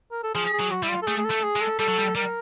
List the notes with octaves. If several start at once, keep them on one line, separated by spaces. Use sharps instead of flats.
A#4
A4
F3 G#4
G#4
F#3
F#4
G3 E4
F4
A4
A3 G#4
G#4
A4
A3
G#4
G#3
A4
G3 A4
F#3
G3
G3 A#4